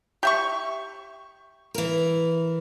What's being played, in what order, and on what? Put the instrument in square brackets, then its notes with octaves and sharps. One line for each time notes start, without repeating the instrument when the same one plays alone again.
[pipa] G4 E5 C#6
[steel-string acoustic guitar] E3 A#4